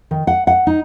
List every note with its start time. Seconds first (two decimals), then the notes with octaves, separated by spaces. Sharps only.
0.11 D#3
0.27 F#5
0.47 F#5
0.67 D#4